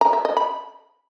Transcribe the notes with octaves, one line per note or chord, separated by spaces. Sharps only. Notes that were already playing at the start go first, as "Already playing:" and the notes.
A#5
E5
D#5
B5